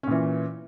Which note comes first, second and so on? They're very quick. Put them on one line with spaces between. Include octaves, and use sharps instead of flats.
C#4 A#2 E3